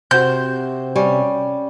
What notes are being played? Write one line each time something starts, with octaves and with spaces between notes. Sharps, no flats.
C3 F#4 C5 G6
G3 C#4